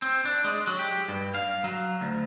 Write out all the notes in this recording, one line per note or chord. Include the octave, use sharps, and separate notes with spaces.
C4
D4
G#3
F#3
G4
G2
F5
F#3
D2